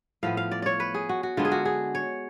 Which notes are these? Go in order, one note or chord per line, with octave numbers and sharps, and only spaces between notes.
A2 F3 B3 F5
F5
D5
C#5 D5
B4
G#4
F#4
F#4
D3 G#3 B3 D4 F4
G#4
F#4
G#4
C#5